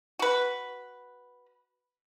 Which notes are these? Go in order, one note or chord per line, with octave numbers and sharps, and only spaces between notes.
F#4 B4